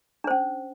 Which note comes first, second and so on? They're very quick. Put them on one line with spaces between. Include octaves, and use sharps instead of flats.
D4 C5 C#4